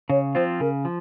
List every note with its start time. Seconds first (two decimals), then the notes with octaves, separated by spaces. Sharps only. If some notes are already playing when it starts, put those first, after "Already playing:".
0.09 C#3 C#5
0.35 F3 C4 F4 C5
0.60 C#3 A#4
0.85 F3